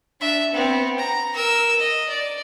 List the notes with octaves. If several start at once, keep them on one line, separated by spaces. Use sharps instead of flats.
D4 E5
B3 C4
A#5
A#4 E6
D#5
D5